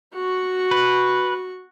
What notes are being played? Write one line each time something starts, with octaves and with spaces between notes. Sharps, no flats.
F#4 C#6
B4